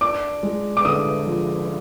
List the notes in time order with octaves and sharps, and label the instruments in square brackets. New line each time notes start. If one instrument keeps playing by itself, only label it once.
[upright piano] D4 [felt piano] D6
[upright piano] G#3
[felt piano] D6
[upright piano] D3 [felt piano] D#6
[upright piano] F3